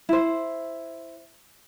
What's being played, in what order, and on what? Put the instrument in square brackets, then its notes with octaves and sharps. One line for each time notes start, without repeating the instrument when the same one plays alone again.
[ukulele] E4 C5